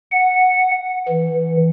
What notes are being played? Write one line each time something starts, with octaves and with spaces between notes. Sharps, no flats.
F#5
E3